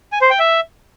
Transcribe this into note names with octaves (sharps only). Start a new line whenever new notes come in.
G#5
C5
G5
E5